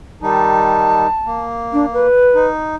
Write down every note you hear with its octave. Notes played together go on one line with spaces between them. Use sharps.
D#3 G3 D#4 A5
A#3
D4
B4
D#4